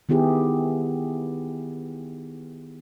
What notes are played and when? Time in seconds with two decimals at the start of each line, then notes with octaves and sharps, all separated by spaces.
0.09 D#3 B3 E4 G4 G#4